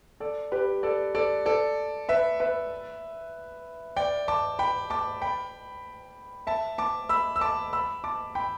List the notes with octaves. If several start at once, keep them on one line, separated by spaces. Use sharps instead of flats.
A4 D5
G4 B4
A4 D5
A4 D5
A4 D5
B4 E5
B4 E5
D5 G5
A5 D6
G5 B5
A5 D6
G5 B5
E5 A5
A5 D6
B5 E6
E6
A5 D6
B5 E6
A5 D6
G5 B5